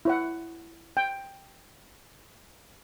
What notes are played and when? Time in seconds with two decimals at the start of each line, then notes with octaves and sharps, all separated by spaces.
0.05 E4 C#5 F#5
0.97 G5